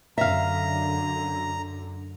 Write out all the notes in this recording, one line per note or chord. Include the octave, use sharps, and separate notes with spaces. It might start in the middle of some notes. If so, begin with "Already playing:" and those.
F#2 D3 E5 F5 A#5